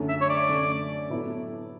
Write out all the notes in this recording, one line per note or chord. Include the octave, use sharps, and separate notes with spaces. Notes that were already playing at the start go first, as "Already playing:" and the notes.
Already playing: F#2 D3 A3
E5
C#5
D5
F#2 D3 A3
A2 F#3 B3 E4 A4